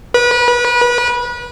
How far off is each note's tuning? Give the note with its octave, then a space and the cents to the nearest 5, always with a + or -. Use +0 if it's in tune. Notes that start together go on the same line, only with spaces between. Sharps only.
B4 -30